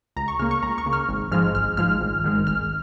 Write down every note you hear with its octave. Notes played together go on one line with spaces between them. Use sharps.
C#2 A#5
C#6
C#3 A#3 F6
C#6
C#2 A#5
C#6
C#3 A#3
F6
G#1
G#2 F3 G#3 F6
G#1 F6
G#2 F3 G#3 F6
G#1
G#2 D#3 G#3
G#1 F6